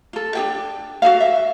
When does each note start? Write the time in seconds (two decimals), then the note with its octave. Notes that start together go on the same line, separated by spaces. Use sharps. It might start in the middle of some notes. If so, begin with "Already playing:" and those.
0.13 F4 A4
0.35 D4 G#4 G5
1.02 F#4 G#4 A4 F5
1.20 E5